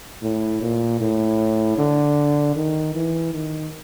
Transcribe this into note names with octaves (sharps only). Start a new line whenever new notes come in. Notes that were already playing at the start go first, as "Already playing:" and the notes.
A2
A#2
A2
D3
D#3
E3
D#3